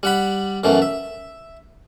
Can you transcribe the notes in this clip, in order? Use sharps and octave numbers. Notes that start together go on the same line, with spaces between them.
G3 F#5 B5
F#2 B2 E3 A3
E5